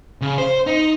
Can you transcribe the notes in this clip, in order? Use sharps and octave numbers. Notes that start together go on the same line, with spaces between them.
C#3
C5
D#4